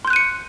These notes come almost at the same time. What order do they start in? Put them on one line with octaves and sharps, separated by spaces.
C6 G6 F#6 D#7 C#7